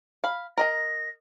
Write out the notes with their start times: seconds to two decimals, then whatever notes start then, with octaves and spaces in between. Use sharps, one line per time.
0.24 F5 B5
0.58 A#4 D#5 A#5 A#6